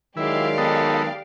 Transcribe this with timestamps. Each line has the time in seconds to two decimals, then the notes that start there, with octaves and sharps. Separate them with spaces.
0.17 D#3 F#3 G#3 E4 G4 D5 F5
0.58 B3 D#4 A4